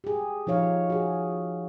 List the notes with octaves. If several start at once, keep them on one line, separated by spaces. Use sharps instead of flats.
G4 G#4
F3 D#4 C#5 F5
F#4 G#4